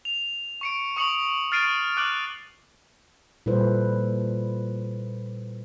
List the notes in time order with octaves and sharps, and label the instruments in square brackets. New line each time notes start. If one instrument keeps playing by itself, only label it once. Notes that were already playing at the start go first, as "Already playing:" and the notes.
[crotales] F7
C#6 C#7 D7
C#6 D#6 C#7 F7 F#7
F6 A6 C7 D7 D#7
D6 F6 F#6 D7 F#7
[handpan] A#2 G3 E4 A4 B4 C5